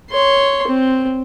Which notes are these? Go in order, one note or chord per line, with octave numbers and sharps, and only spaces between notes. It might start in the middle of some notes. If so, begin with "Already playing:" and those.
C#5 C6
C4